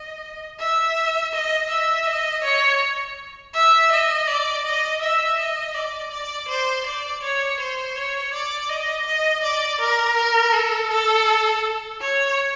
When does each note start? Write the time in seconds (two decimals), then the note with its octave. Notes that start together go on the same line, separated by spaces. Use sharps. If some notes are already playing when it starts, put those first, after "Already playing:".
Already playing: D#5
0.59 E5
1.33 D#5
1.70 E5
2.06 D#5
2.44 C#5
3.54 E5
3.92 D#5
4.27 D5
4.65 D#5
5.02 E5
5.39 D#5
5.75 D5
6.11 D5
6.48 C5
6.85 D5
7.23 C#5
7.60 C5
7.96 C#5
8.33 D5
8.69 D#5
9.06 D#5
9.43 D5
9.80 A#4
10.17 A#4
10.53 A4
10.90 A4
12.01 C#5